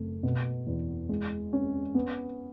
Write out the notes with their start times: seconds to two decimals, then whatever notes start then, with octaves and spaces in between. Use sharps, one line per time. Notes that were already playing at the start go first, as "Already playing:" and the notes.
Already playing: F#1 A3
0.23 B2
0.67 E2
1.09 G#3
1.53 C#4
1.95 B3